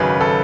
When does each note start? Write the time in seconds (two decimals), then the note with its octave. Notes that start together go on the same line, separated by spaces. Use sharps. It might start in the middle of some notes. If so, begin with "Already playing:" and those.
Already playing: G#1 F#2 C#3 F#3 B4
0.21 A4